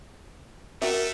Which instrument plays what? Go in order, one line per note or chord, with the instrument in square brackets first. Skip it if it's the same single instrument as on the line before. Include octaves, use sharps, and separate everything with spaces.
[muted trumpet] A3 [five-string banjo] F#4 A#4 E5